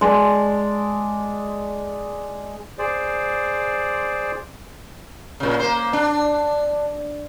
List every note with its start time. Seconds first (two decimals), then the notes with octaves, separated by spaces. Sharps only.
0.01 G#3 D5 A5
2.78 G#4 C5 D5
5.40 A#2 C#3
5.60 A#3 C5
5.93 D4